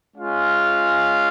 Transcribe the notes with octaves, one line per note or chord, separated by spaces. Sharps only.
G#3 C#4 F4 F5